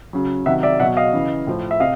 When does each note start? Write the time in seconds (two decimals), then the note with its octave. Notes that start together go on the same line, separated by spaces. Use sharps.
0.13 C#3 F#3
0.46 C3 D#3 F#3 E5 F#5
0.63 D5 E5
0.80 B2 F#3 E5 F#5
0.97 D#5 F5
1.13 C#3 E3
1.47 A2 F3
1.71 E5
1.80 C3 D#5 F5